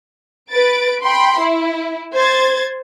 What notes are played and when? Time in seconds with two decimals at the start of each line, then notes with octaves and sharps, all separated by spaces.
0.51 B4 A6 D7
1.01 G5 B5 C6
1.39 E4
2.14 C5 G#6 A6